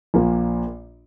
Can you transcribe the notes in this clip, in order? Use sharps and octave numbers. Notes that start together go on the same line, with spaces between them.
A#1 A#2 F3 A#3